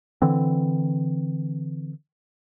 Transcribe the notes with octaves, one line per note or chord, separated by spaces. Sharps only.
D3 E3 C4